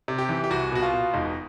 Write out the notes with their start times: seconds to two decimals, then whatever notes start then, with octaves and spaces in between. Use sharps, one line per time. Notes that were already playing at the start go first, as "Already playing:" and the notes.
0.08 C3
0.18 G4
0.29 E3
0.44 G4
0.50 C2 F#4
0.72 B2 F#4
0.82 F4
0.94 B2
1.14 E1 D#4